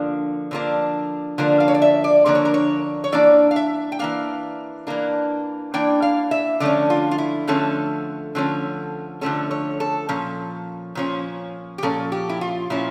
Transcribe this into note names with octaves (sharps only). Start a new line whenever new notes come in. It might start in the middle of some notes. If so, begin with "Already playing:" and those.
Already playing: D3 F3 A#3 D4 F5
D3 F3 A#3 D4
D3 F3 A#3 D4
F5
C#5
D5
E5
D5
D3 F3 A#3 D4 D5
C#5
A#4
C#5
C#5
E3 A#3 D4 D5
F5
E5
G5
E3 A#3 D4 F5
E3 A#3 D4
E3 A#3 D4 G5
F5
E5
D3 F3 A3 C#4 D5
F4
F4
E4
D3 F3 A3 C#4 A4
D3 F3 A3 C#4
D3 F3 A3 C#4 A4
C#5
A4
A#2 F3 C#4 A4
A#2 F3 C#4
G4
A#2 F3 C#4 A4
G4
E4
F4
A#2 F3 C#4 E4